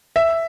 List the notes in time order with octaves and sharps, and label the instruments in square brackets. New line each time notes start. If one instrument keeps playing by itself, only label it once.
[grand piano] E5